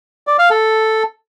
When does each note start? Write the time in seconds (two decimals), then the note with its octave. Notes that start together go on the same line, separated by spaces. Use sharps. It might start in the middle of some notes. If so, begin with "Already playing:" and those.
0.27 D5
0.39 F5
0.50 A4